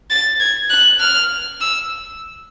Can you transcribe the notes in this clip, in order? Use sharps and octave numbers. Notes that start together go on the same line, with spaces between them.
A6
G#6
F#6
F6
E6